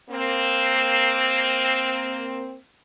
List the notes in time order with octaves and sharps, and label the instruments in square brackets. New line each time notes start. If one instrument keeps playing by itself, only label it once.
[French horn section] A#3 C4